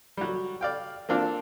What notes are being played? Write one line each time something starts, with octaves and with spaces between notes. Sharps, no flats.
F#3 G3
D5 F5 G5
A#3 C4 D4 F4 A4